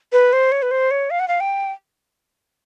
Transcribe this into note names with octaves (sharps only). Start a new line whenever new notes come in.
B4
C5
C#5
B4
C5
C#5
F5
F#5
F5
G5